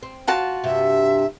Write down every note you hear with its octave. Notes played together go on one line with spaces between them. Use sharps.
C4
F4 F#4 A5
G2 C3 E5